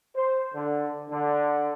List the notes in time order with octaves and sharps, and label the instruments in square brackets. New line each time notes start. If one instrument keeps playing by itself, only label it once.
[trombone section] C5
D3
D3